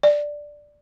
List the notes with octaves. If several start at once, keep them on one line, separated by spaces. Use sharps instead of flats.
D5